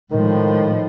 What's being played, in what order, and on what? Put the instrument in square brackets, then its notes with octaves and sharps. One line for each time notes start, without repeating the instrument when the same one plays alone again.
[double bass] A2 F3 [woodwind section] D#3 G#3